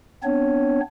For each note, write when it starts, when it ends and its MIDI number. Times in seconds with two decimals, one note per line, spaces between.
0.23 0.80 59
0.23 0.80 60
0.23 0.80 62
0.23 0.80 73